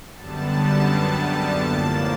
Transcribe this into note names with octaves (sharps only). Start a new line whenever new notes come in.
F#2 D3 G3 B3 A5
A5
A2 F3 A#3